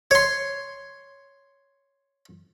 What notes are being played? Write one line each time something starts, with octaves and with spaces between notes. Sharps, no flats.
C#5 C6